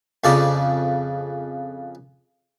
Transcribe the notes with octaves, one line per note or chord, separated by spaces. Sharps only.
F2 C#3 D5